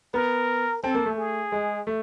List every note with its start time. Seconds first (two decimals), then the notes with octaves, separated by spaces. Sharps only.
0.14 B3 A#4
0.83 C4 A4
0.94 A#3
1.06 A3
1.18 G#4
1.52 G#3
1.87 A3